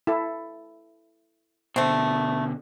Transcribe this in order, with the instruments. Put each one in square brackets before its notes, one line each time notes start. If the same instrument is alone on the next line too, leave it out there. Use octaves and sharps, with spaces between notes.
[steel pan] E4 A4
[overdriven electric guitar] B2 D3 [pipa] A3 C4